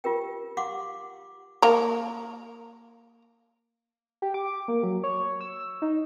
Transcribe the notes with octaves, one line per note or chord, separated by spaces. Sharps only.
F4 G4 A#4 G5
G4 F5 F#5 C6 D6
A#3 A#4
G4
D6
A#3
F#3
C#5
E6
D#4